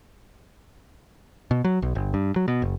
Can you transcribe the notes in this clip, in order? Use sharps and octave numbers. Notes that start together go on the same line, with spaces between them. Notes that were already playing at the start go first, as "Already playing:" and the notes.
B2
F#3
B1
G1
G2
F#3
B2
F#1